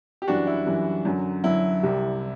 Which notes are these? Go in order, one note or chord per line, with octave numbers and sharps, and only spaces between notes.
G4
F#2 E3 G3 D4 F#4
E4
F#2 E3 G3
F#2 D3 F#3
F#2 D3 F#3 E4
C2 C3 G3